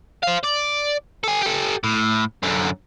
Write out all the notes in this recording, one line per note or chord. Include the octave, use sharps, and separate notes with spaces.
C5 F5
D5
A4 G#5
G4 A4
A2
F#2 D3